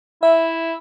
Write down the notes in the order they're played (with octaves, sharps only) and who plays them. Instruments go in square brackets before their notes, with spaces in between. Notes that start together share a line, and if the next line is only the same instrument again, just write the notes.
[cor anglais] E4 [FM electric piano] E5